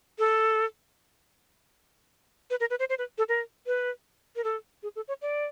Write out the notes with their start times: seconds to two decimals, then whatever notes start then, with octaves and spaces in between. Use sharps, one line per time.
0.19 A4
2.50 B4
2.60 A#4
2.70 B4
2.79 C5
2.89 C5
2.98 B4
3.18 A4
3.29 A#4
3.67 B4
4.36 A#4
4.44 A4
4.83 G#4
4.96 A4
5.08 C#5
5.22 D5